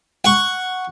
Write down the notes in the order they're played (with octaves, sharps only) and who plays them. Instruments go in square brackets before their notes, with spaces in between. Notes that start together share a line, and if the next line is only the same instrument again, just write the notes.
[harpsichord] F#5 C#6